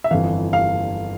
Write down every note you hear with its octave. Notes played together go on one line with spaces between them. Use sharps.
E5
G1 F2 E3 F5
F5